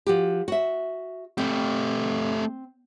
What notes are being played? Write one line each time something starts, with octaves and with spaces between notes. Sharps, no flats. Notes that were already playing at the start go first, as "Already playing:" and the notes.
F3 F#4 G4
F#4 E5
A3 C4 G4